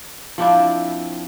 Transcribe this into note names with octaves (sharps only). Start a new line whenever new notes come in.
F3 C4 D4 E4